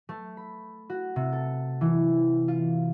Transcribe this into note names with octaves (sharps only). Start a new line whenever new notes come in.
A3
B5
F#4
C3
A4
E3
F4